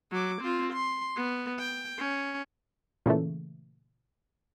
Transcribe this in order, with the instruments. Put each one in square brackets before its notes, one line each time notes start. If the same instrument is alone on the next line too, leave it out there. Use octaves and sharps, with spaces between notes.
[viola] F#3 D6
C4 F4
C6
B3
G5
C#4
[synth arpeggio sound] A#2 C#3 E3 A3